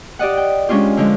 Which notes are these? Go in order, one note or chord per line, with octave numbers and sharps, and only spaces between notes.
G4 D5 D#5 F#5
G5
G#3 C#4 D4 F4 G4
D3 F3 G#3